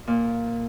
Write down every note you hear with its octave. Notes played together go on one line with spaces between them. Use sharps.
A#2